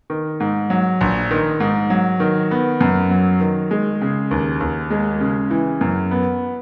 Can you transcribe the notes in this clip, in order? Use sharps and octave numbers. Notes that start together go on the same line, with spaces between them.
D#3
G#2
F#3
A#1
D#3
G#2
F#3
D#3
B3
F#2
F#3
D#3
G#3
C#3
D#2
D#2
G#3
C#3
E3
F#2
B3